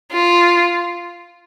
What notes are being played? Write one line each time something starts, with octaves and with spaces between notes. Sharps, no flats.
F4